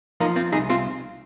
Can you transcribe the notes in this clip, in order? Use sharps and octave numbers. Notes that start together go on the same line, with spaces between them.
F3 A#3 D#4
C4 F4
C2 D#4 G#4
C4 F4